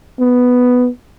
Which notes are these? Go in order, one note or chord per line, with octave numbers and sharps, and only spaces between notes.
B3